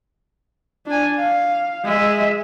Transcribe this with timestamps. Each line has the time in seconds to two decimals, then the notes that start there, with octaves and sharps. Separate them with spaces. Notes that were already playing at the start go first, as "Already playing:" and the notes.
0.86 D4 G#5
1.18 F5
1.85 G#3 E5